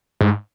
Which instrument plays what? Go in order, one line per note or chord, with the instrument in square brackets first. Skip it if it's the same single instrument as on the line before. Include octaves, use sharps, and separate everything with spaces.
[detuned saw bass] G#2